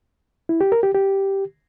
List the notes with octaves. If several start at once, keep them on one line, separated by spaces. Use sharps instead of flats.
E4
G4
A#4
G4
G4